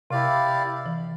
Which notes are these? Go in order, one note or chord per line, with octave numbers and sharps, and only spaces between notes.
C3 E4 G4 D5 F5
E3